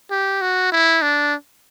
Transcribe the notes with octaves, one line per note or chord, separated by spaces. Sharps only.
G4
F#4
E4
D4